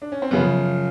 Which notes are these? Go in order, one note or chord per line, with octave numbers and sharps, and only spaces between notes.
D4
C#4
C4
F#2 C#3 F3 B3